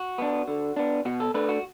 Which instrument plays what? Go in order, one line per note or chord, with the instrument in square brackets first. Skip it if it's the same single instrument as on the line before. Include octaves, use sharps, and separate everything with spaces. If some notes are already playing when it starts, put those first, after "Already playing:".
Already playing: [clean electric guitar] F#4
B3 D4
D3
B3 D4
B2 F#4
A4
A3 D4 B4
F#4